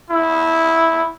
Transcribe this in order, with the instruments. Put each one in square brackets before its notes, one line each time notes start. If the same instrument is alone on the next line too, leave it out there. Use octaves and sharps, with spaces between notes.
[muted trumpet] E4